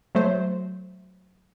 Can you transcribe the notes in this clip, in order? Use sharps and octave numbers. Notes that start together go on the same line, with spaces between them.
F#3 A3 C5